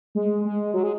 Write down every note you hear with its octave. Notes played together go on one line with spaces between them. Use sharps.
G#3
G#3
F#3
G#3